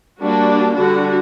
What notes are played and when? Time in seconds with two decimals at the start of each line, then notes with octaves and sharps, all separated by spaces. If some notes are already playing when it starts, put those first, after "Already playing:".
0.22 G3 A#3 D4 F#4
0.76 D3 G3 D4 F#4